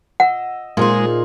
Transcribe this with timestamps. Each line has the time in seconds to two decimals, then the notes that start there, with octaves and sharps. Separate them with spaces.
0.20 D#5 F#5 E6
0.77 A#2 G#3 D#4 F4 G#4 C5